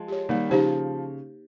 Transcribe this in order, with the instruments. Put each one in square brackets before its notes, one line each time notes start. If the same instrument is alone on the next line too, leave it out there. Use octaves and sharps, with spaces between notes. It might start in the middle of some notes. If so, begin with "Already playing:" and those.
Already playing: [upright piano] F3 G#3
[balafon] G4 C#5
[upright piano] D#3 G3 [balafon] A#3
[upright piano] C#3 F3 [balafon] D#4 G4 C5